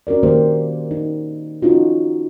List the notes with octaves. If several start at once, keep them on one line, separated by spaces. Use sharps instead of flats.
C#4 F#4 A#4 D5
D#3 A#3 C#4 G4 C5
D#4
C#4 D#4 F4 F#4